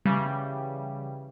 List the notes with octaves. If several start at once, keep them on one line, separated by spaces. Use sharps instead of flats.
C#3 E3 G3